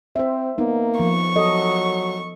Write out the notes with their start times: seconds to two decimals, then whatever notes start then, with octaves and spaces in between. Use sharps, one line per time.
0.16 C4 C5 E5
0.58 A#3 B3 D#4
1.00 F3 C#6
1.36 F#3 A4 D#5